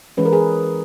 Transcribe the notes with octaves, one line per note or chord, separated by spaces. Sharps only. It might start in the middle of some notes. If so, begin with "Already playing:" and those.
E3 G#3 C#4 B4
A#4
G#4 B4